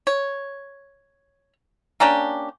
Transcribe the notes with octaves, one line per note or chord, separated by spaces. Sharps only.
C#5
A#3 C#4 D4 G4